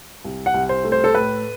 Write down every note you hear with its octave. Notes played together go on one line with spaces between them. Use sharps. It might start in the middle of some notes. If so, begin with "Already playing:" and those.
C2
F#5
C2
C5
A3
C5
A4
A2 B4